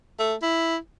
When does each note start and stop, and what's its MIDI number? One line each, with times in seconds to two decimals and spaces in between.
0.19 0.35 57
0.42 0.76 64